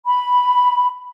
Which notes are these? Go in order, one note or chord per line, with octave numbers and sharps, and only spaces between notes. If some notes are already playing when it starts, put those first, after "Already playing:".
B5